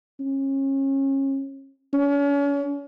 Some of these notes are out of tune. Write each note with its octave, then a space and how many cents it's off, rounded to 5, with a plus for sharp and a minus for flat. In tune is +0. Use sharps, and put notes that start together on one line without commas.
C#4 -30
C#4 +40